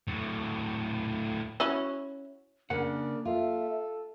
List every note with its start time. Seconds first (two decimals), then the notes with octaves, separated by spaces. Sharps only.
0.08 A2 F#3
1.60 C#4 E4 F#4
2.70 C#3 A#3 D4 A#4 F#5
3.25 F4 A4 E5